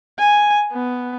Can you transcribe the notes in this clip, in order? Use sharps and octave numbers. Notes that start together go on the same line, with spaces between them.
G#5
B3